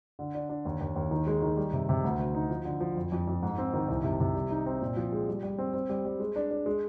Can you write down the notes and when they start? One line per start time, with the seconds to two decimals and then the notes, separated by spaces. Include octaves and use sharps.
0.19 D3
0.34 D4
0.49 D4
0.65 D#2
0.80 D#2
0.96 D#2
1.11 D#3
1.27 G#3
1.42 D#3
1.57 G3
1.73 C3
1.89 C3
2.04 D2
2.19 D2
2.35 D#4
2.50 F3
2.65 D3
2.80 F3
2.96 F2
3.12 F2
3.28 F2
3.42 G#2
3.58 C4
3.73 D#3
3.88 C2
4.04 C3
4.20 C3
4.35 G3
4.51 D#4
4.66 C4
4.82 A#2
4.97 F3
5.12 G#3
5.28 G3
5.43 G3
5.59 C4
5.74 C4
5.89 G3
6.05 G3
6.20 G#3
6.36 D4
6.51 D4
6.66 G#3